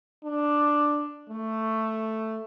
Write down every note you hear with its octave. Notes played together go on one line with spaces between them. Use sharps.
D4
A3